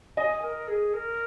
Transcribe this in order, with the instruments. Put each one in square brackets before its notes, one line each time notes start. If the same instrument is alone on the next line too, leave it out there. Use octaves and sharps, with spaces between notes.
[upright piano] D#5 [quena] G#5
[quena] A#4
G#4
A#4